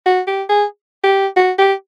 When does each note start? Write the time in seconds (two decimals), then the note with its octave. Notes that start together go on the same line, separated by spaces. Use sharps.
0.06 F#4
0.27 G4
0.49 G#4
1.04 G4
1.36 F#4
1.58 G4